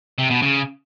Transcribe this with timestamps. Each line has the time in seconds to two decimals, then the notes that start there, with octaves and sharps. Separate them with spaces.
0.18 C3
0.30 B2
0.42 C#3